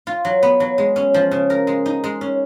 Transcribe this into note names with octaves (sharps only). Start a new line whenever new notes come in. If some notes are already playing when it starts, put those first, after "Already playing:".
F4
F#3
B3
F#3
G#3
C#4
F3
C#3
A#4
G#3
D#4
G#3
C#4